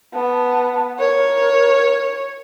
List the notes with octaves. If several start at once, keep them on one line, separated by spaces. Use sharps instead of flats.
B3 A5
A#4 C#5